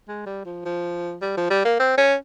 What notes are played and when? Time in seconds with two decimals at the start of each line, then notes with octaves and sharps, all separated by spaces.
0.08 G#3
0.26 G3
0.45 F3
0.65 F3
1.21 G3
1.37 F3
1.50 G3
1.65 A#3
1.80 C4
1.98 C#4